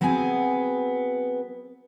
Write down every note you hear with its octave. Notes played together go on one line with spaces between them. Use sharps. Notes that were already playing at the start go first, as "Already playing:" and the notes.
F#3 B3 C4 G#4 G#5